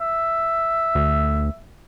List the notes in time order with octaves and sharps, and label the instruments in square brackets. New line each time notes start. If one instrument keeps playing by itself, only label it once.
[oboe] E5
[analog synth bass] D2